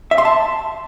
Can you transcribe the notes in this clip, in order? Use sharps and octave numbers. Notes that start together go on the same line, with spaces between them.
E5
C6
A5